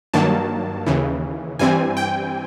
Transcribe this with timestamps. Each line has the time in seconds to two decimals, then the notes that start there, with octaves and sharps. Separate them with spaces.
0.14 G2 D#3 F#3 A#3 A5
0.86 D#2 C#3 E3
1.59 G2 E3 G3 C4 G#5
1.97 G5